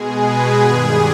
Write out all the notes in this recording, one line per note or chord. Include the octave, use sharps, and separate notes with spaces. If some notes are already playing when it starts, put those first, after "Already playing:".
Already playing: B2 G#3 G#4
B4
G2 D#3 G3 G#4